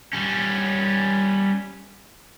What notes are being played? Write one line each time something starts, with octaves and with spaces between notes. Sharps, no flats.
G3 C#4